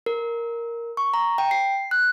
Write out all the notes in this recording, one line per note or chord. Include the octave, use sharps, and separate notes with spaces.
A#4
C#6
A#5
G5
C7
F#6